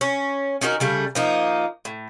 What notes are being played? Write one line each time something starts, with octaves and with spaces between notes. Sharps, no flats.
C#4
C#4 D#4 F#4 A#4
C#3 G3 A3
F3 A#3 D#4
A2